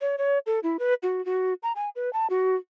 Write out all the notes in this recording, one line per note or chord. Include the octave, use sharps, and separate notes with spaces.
C#5
C#5
A4
E4
B4
F#4
F#4
A#5
G#5
B4
A5
F#4